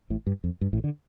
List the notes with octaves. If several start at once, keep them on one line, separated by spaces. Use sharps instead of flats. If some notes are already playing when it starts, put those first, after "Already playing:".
A1 A2
G2
F2
G2
A1 A2
D3